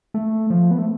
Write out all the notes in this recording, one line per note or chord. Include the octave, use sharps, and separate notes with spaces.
A3
F3
B3
A3